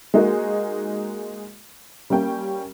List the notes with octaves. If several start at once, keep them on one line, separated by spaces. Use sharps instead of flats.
G#3 A#3 D#4 F#4 A#4
G3 A#3 C#4 G5